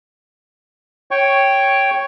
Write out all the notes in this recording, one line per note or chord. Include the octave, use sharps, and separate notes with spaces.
C#5 G5 C#6